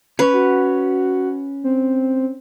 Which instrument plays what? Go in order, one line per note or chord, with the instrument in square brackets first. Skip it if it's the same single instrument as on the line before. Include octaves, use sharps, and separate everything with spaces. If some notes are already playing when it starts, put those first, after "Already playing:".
[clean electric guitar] C#4 C#5 [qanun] B4
[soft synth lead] F#4
C4